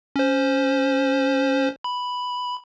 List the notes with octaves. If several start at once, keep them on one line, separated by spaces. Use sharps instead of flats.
C#4 C5
B5